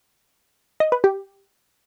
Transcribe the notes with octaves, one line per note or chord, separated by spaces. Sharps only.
D#5
B4
G4